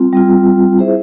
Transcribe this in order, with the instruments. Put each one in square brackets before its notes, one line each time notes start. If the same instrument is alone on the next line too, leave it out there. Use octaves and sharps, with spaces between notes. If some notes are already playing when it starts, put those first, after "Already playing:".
Already playing: [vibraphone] G3 C4 F4
G3 C4 F4
E4 G#4 C5 E5